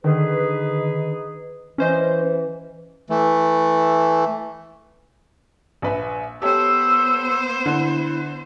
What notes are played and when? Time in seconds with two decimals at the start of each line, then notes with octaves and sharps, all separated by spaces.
0.04 D3 D#3 D#4 G#4 B4
1.78 E3 C#4 C5 D#5
3.10 E3 A3
5.82 A#1 B4 E5
6.42 B3 G4 A4 C5 C#5 E6
7.66 D3 E4